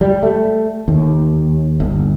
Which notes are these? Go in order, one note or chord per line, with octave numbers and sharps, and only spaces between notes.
G3
A3
D#2
G1